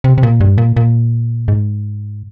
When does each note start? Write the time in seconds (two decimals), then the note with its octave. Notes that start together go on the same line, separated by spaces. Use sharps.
0.04 C3
0.18 C3
0.23 A#2
0.41 G2
0.58 A#2
0.77 A#2
1.48 G#2